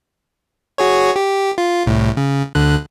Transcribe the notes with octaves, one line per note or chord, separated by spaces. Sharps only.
F#4 G#4 C#5
G4
F4
C2 A2
C#3
D2 D3 F#6